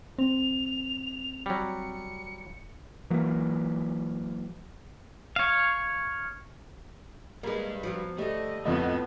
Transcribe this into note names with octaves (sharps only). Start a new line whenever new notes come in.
C4 F7
F#3 G3 C#7
E3 F#3 A#3
C#5 F5
G3 G#3 A#3 B4
F3 F#3 B3
D3 G3 A3 D#5
F2 A2 F3 A3 B3 D#5